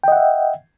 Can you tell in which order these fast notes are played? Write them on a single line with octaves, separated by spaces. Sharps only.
G5 D#5 F#5 E5